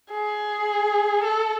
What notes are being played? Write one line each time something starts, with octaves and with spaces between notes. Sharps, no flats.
G#4
A4